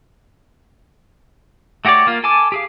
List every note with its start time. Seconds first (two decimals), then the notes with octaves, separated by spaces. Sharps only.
1.85 A3 F#4 G4 C#5 D5
2.07 A#3 F4
2.24 A4 G#5 A5 D6
2.52 G4 G#4 F5